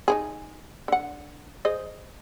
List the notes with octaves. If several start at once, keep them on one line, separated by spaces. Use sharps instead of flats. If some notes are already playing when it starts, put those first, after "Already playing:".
D#4 E4 G#4
D3 F#5
G#4 C5 D#5